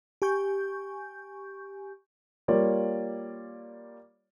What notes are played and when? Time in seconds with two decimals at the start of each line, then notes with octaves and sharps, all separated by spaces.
0.22 G4 G#5 C#6 G6
2.48 G3 A#3 F4 C#5 D5